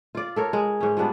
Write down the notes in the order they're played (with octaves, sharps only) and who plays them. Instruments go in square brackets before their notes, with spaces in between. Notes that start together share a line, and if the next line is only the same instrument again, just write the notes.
[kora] F4 D5
A4 A#4 C#5
G#3
G#2 C#4
F3 G3 B3 D4